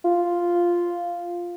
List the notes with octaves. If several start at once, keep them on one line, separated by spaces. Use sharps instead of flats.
F4